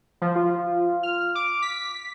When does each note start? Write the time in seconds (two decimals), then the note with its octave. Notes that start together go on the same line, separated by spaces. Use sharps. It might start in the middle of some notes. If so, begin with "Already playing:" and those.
0.21 F3
0.35 F4
1.03 F6
1.35 D6
1.62 B6